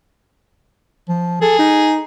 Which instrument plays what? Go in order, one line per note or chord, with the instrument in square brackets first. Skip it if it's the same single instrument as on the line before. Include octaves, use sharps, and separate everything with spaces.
[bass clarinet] F3
[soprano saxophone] G#4 [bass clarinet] A4
[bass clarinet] D#4